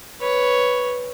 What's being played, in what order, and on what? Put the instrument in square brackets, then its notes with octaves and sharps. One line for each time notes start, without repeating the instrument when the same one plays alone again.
[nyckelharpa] B4 C#5